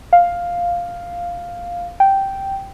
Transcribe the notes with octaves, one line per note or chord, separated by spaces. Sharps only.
F5
G5